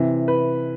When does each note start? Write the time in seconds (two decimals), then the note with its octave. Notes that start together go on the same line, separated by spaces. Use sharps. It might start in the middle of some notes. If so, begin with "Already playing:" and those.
Already playing: C3 E3
0.28 B4